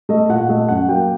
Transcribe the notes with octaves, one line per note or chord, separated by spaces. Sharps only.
A3 D#5
A#2 F#5
A3 D#5
F#2 F#5
F#3 A#3 G5